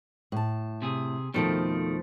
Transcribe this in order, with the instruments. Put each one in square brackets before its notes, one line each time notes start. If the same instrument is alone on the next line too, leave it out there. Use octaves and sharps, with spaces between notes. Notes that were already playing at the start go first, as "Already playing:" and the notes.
[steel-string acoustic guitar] A2 A5
[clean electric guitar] C3 G#4
[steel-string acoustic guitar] F2 F3 A5 [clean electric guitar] B2 D#3 A3